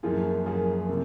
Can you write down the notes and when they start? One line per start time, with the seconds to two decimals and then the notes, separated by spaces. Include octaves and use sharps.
0.03 F#2 F3 A#3 F4 G#4
0.46 F#2 F3 A#3 F4 G#4
0.89 C3